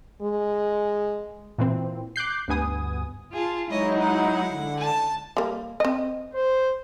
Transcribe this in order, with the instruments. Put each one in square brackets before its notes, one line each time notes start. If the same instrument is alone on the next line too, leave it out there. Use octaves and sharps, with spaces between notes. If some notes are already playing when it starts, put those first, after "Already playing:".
[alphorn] G#3
[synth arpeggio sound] A#2 E3 C4
D6 F#6 G6 C7
D2 G2 B3 G#5 D#6
[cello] F4 [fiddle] G#4 A5
[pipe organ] F#3 D#4 [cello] G#3 E4 [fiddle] C#5 D#5
[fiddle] F#5
[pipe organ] D3
[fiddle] A5
[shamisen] G3 A#3
C4 D#5
[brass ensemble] C5